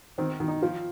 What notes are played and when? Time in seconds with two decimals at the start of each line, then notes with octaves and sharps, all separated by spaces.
0.18 D#3 C4
0.40 D#3
0.48 D#4
0.62 F3 F4